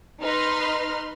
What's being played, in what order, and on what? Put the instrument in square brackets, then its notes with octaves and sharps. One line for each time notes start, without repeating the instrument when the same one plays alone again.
[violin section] D#4 B4 C6 F6